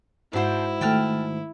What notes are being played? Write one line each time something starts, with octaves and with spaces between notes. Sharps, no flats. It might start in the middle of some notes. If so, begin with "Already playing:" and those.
G#2 D4 E4 F#4 C5
D#3 A3 G5 A5 F6